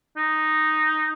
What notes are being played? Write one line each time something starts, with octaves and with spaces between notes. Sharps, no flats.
D#4